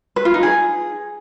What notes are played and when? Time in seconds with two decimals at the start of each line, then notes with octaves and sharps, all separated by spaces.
0.16 B4
0.25 F4
0.34 D#4
0.43 G#4